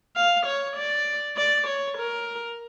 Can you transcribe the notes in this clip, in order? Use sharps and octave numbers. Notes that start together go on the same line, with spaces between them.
F5
C#5
D5
D5
C#5
A#4